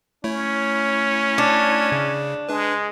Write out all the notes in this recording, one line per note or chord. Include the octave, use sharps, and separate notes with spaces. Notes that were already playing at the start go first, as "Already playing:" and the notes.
A3 C#4 E4 C#5
D4
C#3
G#3 D4 B4